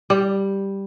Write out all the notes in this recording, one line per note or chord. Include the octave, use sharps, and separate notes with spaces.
G3